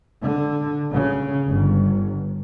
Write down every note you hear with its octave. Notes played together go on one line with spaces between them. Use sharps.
D3
C#3
G1